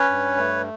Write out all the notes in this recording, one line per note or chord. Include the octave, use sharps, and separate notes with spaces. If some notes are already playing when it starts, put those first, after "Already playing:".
Already playing: C#4 B4 C#5
G2
A3